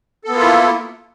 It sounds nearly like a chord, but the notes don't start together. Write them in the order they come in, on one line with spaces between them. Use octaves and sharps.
A4 B3 A#3 F4 E4